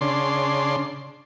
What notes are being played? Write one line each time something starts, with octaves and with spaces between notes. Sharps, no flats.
C#3 D4 C6